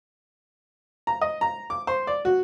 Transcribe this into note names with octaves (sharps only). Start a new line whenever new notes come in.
A#5
D#5
A#5
D6
C5
D5
F#4